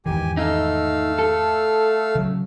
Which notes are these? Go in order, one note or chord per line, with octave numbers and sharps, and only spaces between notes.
E2 G#2 D#3 G4 G#5
A3 D#4 F5 E6
A4
C#3 F#3